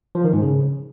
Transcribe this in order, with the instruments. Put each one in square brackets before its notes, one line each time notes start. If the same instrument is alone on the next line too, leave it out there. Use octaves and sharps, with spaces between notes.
[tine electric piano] F3
D#3
G#2
C#3